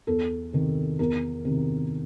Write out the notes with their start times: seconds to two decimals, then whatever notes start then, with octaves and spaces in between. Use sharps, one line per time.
0.07 E2 A4
0.53 C3 D#3
0.99 E2 A#4
1.45 C3 D#3